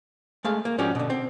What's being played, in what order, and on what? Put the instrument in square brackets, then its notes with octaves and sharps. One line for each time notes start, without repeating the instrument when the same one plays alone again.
[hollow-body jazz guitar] G#3 A3 F5
A#3
G#2 F3 C#4 D4 F#4 G4
B2 D3
C4